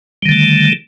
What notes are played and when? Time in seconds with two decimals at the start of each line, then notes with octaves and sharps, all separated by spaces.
0.22 G3
0.26 D#3
0.29 D3
0.32 A3